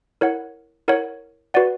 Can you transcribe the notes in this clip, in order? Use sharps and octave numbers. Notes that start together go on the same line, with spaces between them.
E4 A#4 C#5 F#5
E4 A#4 C#5 F#5
F#4 B4 D5 F#5